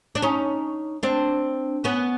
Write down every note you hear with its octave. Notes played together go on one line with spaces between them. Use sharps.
D4
C#4 D#4
C4 D4
B3 C#4